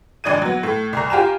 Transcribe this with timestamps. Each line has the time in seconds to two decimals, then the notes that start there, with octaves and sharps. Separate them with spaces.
0.24 A1 D4 D#5 G#6 D#7
0.42 F#3 B3
0.63 A2
0.93 C2 A#5
1.10 F4 G4 G#5 A#5 E7